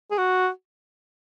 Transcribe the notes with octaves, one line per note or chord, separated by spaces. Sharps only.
G#4
F#4